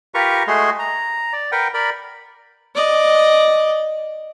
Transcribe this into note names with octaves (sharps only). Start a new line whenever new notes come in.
F4 G4 A#4 B4 A#5 C#6
G#3 A3 F#4 G#4 C6
A#5
D5
A#4 B4 F#5 G5
A#4 D5 B5
D5 D#5